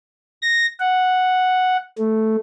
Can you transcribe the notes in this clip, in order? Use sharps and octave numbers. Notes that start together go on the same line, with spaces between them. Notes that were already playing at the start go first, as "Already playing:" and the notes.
A#6
F#5
A3